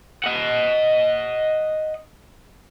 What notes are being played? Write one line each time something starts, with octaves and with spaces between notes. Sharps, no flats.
D#5 F#5